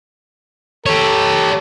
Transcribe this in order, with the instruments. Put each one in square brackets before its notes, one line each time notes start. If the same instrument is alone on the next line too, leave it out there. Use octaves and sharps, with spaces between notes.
[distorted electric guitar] G4 C#5 [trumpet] A4